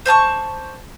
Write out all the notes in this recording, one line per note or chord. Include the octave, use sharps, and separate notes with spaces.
C5 D5 A5 C#6